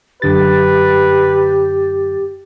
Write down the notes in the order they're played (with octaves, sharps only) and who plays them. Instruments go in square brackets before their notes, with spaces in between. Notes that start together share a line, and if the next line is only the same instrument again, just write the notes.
[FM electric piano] F#2 D3 A6 [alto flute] G4 [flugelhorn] B4